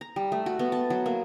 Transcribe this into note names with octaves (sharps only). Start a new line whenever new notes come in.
A#5
G3
A3
F#4
B3
A5
F#3
A#3